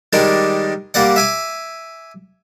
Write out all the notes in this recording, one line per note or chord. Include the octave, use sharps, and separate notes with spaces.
D#3 G3 G#3 D4 A#4
G3 A#3 D5 F#5
E5 G#5 D6